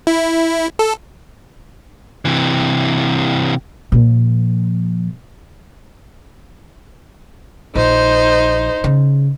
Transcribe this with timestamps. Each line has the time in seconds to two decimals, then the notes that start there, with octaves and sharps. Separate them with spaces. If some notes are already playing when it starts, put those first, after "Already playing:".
0.07 E4
0.79 A4
2.25 C3 E3
3.92 A#2 F3
7.75 A#1 D#4 C5
8.84 C#3